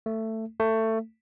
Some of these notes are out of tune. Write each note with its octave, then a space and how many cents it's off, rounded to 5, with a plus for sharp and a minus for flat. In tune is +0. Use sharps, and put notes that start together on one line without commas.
A3 +15
A3 +20